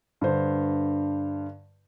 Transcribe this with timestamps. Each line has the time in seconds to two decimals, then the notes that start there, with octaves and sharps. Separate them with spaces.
0.21 G2 D3 C5